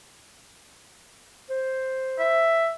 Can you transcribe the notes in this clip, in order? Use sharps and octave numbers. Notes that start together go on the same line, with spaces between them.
C5
E5